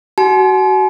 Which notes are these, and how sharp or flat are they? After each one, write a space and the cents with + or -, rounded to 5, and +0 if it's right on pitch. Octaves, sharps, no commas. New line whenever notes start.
F#4 +25 G#5 +45